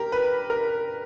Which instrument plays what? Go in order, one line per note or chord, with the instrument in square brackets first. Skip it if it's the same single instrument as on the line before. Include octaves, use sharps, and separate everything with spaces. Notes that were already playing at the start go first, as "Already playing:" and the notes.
Already playing: [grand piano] G4 A#4
B4
A#4